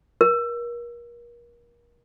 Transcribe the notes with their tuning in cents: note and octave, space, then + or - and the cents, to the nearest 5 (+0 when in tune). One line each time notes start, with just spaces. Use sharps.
A#4 +35